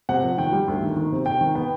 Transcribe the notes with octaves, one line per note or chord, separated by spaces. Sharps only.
C3 F#5
F3
D#3 G5
G3
D2
D#3
D#3
C3
C3 G5
D#3
B3 G5